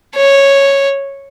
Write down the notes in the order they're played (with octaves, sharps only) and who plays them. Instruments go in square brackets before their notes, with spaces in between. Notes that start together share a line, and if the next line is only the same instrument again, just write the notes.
[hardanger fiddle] C#5